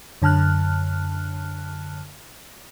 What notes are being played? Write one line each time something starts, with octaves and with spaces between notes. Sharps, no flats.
F#2 D3 A5 F6 F#6